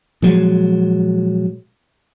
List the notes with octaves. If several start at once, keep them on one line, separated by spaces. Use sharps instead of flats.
A#2 F3 F#3 G#3